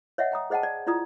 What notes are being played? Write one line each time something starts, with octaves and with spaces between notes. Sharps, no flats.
C#5 D#5 E5 F#5
G5 A#5 D#6
G#4 C5 D#5 F#5 G5 A5
D5
E4 F4 D5 A#5 D#6